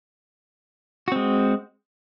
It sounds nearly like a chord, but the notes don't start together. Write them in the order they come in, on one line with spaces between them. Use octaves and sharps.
F#4 C4 G#3